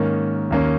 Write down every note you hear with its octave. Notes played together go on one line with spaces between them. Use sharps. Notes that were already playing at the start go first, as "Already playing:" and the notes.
Already playing: G#2 D#3 A#3 C#4
D#2 D#3 A#3 C#4